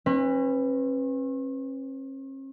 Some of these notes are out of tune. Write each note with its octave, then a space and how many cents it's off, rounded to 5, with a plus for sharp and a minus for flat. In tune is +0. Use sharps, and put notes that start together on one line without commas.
C#4 -45 B4 +5